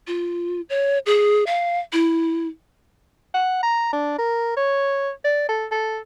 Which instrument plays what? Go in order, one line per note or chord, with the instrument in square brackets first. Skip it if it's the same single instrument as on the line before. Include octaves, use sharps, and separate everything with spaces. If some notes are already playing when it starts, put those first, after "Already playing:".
[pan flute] F4
C#5
G#4
F5
E4
[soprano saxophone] F#5
A#5
D4
A#4
C#5
D5
A4
A4